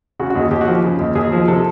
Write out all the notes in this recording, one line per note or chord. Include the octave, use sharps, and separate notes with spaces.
C#3 F#4
F#4
D#2
G#4
D#2 G4
F#4
F3 G4
C#3
D#2
D#2 G#4
F3
C3 A4